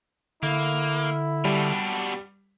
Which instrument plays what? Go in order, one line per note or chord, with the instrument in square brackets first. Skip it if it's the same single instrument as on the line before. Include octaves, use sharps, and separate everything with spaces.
[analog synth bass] D3 [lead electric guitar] A#3 [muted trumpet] E4
[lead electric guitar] B2 D4 [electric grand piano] G3